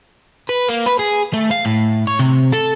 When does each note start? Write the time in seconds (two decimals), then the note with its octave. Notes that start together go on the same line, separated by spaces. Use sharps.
0.49 B4
0.68 A#3
0.86 B4
0.99 G#4
1.33 A3
1.51 F5
1.65 A2
2.07 C#5
2.19 C3
2.52 A4